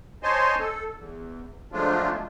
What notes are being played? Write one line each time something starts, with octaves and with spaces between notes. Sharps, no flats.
C5 C#5 D#5 G#5 A5 C6
A4
E2
F3 F#3 G#3 A3 D4 F4